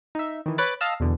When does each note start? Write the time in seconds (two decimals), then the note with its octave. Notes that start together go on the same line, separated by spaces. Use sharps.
0.15 D#4 E5
0.46 D#3 E3
0.58 B4 C#5 B5 D6 F#6 A6
0.81 D#5 F5 A5 E6 F6
1.00 E2 B2 D3